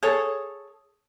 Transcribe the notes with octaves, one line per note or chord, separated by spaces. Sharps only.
G#4 A4 C#5